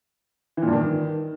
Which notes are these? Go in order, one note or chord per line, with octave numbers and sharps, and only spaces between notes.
E3
A#2
G2
D#3